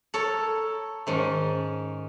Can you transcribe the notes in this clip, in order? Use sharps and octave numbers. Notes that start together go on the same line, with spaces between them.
A4 A#4 C#5
G#2 D#3 C#4